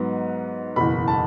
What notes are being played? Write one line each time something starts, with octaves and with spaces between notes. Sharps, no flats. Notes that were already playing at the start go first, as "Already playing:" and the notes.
Already playing: G#2 F#3 B3 D#4
F#1 E2 B2 B5
A5